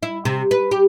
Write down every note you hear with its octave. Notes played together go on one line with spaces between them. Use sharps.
E4
C3
B4
G4